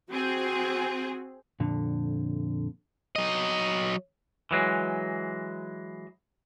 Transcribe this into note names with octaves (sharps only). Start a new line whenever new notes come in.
C4 F#4 G#4
F2 A#2 D3
F#3 D#5
E3 F#3 G#3